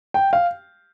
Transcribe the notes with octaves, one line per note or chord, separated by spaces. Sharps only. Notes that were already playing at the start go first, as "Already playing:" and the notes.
G5
F5